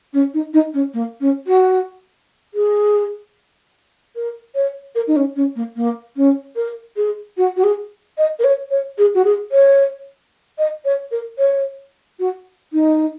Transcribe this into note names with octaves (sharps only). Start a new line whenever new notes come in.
C#4
D#4
D#4
C#4
A#3
C#4
F#4
G#4
A#4
C#5
A#4
D#4
C#4
C#4
A#3
A#3
C#4
A#4
G#4
F#4
F#4
G#4
D#5
A#4
C#5
C#5
G#4
F#4
G#4
C#5
D#5
C#5
A#4
C#5
F#4
D#4